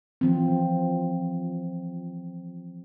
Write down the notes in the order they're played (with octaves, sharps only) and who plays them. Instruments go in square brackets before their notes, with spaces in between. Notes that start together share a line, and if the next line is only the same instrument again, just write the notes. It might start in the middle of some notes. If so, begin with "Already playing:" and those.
[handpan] E3 F3 C4